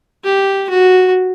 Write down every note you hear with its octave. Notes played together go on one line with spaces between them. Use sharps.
G4
F#4